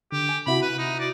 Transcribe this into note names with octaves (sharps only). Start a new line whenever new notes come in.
D3 G4
G#5
C3 E4 F#4 B5
B4
D#4
D5